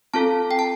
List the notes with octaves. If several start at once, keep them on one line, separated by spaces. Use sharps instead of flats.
C4 F4 A4 A5
G5
A5